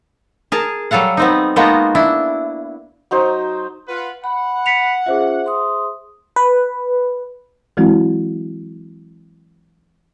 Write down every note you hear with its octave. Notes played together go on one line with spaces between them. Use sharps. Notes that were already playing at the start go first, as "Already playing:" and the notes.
G#4 A#4 A5
F#3 G3 A4 F5 F#5
B3 C4 D#4
G#3 A#3 B3 D#4 F4 F#4
D4 E4
F#3 D#4 C5
F4 B4 F#5
F#5 B5
B6 C#7 F7
C#4 F4 G#4 C5 E5
C6 D#6
B4
E3 F#3 G#3 C4 E4 F#4